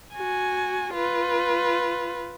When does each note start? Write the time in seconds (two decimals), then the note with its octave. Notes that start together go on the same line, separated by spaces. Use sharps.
0.15 F#4 G#5
0.93 F4 B4